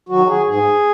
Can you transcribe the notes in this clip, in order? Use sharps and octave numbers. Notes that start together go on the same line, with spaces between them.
D#3 F#3 F#4
G#4
G#2 G#4